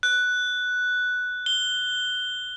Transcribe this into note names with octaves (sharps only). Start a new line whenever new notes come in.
F#6
G7